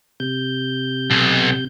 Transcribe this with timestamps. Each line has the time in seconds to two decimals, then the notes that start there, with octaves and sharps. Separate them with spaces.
0.20 C3 G6
1.11 B1